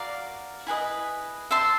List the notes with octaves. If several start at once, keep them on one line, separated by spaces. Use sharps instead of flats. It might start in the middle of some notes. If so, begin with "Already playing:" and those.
Already playing: F#4 A#4 D5 F5
E4 G#4 B4 D#5
C5 E5 A5 C6